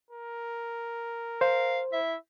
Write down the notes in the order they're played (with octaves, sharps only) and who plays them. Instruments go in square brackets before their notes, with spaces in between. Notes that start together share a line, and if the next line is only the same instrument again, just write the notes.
[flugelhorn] A#4
[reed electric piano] C5 [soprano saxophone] F5
[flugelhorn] E4 [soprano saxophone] E5